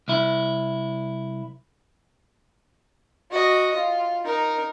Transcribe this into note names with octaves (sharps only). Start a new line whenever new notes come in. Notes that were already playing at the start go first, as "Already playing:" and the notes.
C2 E4
F#4 D#5
F4
D#4 A#4